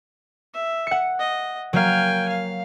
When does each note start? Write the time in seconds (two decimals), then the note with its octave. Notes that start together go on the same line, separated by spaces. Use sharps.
0.54 E5
0.87 F#5 C#7
1.19 D#5
1.73 F#3 A#3 F5 G5 G#5
2.29 F5